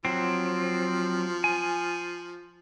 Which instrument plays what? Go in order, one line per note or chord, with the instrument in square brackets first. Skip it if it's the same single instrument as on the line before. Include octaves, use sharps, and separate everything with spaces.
[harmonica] F3 [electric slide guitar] F#3 C4
[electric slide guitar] G#5